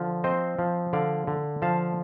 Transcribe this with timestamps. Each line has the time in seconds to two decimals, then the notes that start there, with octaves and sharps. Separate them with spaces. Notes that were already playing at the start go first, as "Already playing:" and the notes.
Already playing: D3 F3
0.24 C4 C5 D#5
0.59 F3
0.93 D3 D5 F5
1.27 D3
1.62 F3 F5 A5